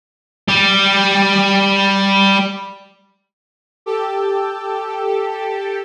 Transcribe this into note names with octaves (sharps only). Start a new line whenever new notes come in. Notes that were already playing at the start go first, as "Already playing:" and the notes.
G3 G4
G4 A4